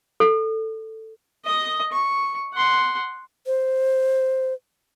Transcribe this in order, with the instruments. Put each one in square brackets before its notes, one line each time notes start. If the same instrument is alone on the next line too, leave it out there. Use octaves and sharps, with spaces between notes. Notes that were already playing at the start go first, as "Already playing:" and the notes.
[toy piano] A4
[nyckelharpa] D#5 D#6
C#6
F#5 C6
[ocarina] C5